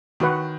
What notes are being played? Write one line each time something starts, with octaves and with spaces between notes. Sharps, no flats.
D#3 F#4 B4 F#5